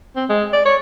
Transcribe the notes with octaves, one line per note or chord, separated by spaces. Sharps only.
C4
G#3
D5
C#5